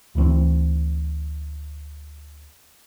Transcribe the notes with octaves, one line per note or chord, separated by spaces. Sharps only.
D2 E3 F3 C4